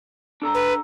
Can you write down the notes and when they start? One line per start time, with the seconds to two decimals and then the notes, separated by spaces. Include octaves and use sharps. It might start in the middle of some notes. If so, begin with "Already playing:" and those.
0.42 D4 A4 A#5
0.54 B4